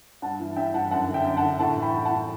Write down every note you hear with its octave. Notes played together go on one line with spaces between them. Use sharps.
G2 F#5 A5
E3
G2 E5 G5
E3 F#5 A5
F#2 F#5 A5
D3
E5 G5
F#2
F#5 A5
D3
A2 F#5 A5
E3 G5 B5
A2
F#5 A5
E3